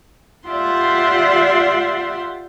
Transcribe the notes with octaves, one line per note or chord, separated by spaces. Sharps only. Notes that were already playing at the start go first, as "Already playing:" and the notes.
F4 G4 D5 E5 F#5 C6